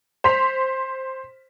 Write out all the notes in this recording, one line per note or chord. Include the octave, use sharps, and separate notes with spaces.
C5 C6 B6 F7